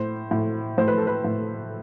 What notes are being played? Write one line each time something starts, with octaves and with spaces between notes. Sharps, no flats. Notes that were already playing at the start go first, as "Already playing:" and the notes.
Already playing: A2 C5
A2
A2 C5
B4
A4
B4
A2